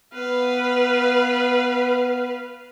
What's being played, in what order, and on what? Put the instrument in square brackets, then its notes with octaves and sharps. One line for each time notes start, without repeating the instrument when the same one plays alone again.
[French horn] B3 [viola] B4 F5